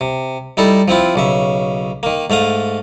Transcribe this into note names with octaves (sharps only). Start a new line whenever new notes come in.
C3
G3 D#4 E4 A4
F3 C4 E4 F4
B1 C#3 E5
D#3 A#3
G#2 A3 F5 D#6